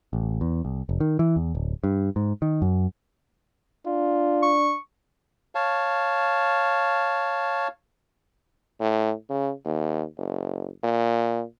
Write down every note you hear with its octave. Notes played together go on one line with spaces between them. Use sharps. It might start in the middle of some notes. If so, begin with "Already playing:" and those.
A1
E2
C2
F1
D#3
E3
E2
D1
G2
G#2
D#3
F#2
D4 F4
C#6
C#5 F5 A5
A2
C#3
D#2
F#1
A#2